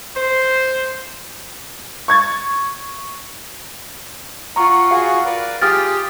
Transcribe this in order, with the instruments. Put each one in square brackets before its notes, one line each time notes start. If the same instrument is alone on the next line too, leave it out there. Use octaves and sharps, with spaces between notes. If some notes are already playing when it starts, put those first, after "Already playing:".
[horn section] C5
[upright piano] C#6 G#6 A6
[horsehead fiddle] F4 F#5 [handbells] A#5 C#6
[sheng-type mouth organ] F#4 G#4 [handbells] F5
[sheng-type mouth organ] A#4 B4 D5
[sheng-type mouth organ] F4 G#4 [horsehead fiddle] G4 [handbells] D#6 F6 A6